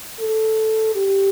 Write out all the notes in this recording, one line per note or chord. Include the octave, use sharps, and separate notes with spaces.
A4
G4